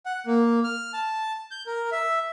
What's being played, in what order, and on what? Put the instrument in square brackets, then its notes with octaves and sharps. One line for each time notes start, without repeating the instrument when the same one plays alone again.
[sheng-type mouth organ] F#5
A#3
F6
A5
G6
A#4
E5